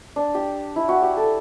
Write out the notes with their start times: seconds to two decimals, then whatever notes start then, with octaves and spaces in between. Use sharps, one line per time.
0.16 D4
0.35 G4
0.76 E4
0.89 F#4
1.02 G4
1.16 A4